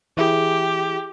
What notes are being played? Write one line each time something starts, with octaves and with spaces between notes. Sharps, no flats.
E3 E4 G4 G#4